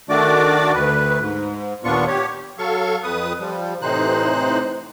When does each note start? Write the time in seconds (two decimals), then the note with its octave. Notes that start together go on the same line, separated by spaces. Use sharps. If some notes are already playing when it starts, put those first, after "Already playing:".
0.09 D#3 A3 D4 F#4 D5 D6
0.74 D2 B4
1.21 G#2
1.84 D#2 A#2 B3 D4 F4 C#6
2.08 G4 C#5
2.58 F#3 A4 F5 C#6
3.03 F2 B4 D#6
3.40 F3 G3
3.82 A2 C3 E3 D#4 C5 F#6